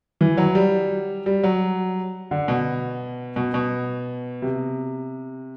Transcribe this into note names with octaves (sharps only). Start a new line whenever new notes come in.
E3
F#3
G3
G3
F#3
D3
B2
B2
B2
C3